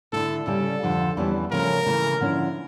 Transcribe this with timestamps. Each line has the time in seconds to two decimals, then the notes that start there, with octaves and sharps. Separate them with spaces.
0.12 D3 A3 E4 A4
0.47 C#3 G3 C#4 A4
0.82 F2 D3 F3
1.17 E2 E3 G3 C#4
1.51 C#3 F3 A3 C#4 A#4
1.86 C#3 E3 A3
2.20 D3 F3 C#4 E4